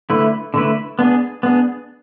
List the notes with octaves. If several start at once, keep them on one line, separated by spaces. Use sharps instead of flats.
D3 A3 E4 B4
D3 A3 E4 B4
B3 D4 G#4
B3 D4 G#4